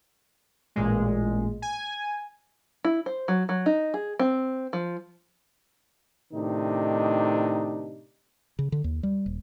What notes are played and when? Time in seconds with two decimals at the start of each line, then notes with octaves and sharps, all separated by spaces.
0.76 A1 A#2 G#3
1.62 G#5
2.85 E4
3.06 C5
3.28 F#3
3.49 F#3
3.66 D#4
3.94 G#4
4.19 C4
4.73 F3
6.33 A2 C3 D#3 D4 D#4
8.59 C#3
8.72 D3
8.84 D#2
9.03 G3
9.26 D#1